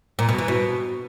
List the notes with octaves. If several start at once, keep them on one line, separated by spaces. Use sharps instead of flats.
A#2
B2
E3
B2